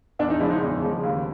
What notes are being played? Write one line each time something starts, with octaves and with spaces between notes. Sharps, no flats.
E2 D4
D#4
C#3 F3 G#3 E4
D#4
E2
C#3 F3 G#3
D#2